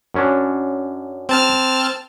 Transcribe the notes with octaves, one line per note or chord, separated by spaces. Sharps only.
F#2 C#4 D4
C4 A5 F6